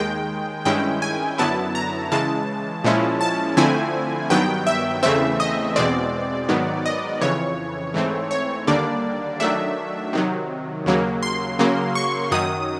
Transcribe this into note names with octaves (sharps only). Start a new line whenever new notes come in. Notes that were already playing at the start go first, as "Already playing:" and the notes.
Already playing: D#2 D#3 G#3 G5
G2 D#3 G#3 C#4 E4 G5
G#5
F#2 D3 F#3 B3 E4 A5
A#5
C#3 E3 G#3 A5
A#2 F3 G#3 C#4 E4
A5
D3 F3 A3 C4 E4 G#5
G2 D#3 F#3 B3 G5
E5
E2 C#3 E3 A3 C4 E5
D#5
E2 B2 G#3 C4 D5
G#2 D#3 F#3 B3
D#5
F2 C#3 E3 C#5
G#2 E3 A3 C4
C#5
D#2 D3 G3 A#3 D4 D5
D#3 F#3 A3 D4 E5
C3 D#3 F#3
D#2 C#3 F#3 A#3
C6
C#3 F#3 A#3
C#6
F#2 D#3 F#3 D#6